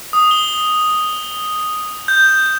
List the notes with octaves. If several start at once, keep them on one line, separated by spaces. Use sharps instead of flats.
D#6
G7
G6